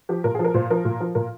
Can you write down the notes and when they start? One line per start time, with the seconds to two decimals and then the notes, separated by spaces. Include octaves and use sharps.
0.09 F3 G4
0.24 A#2 A#4
0.35 G#4
0.39 F3
0.45 A#4
0.54 A#2 C5
0.70 F3 A#4
0.85 A#2
1.00 F3
1.15 A#2 A#4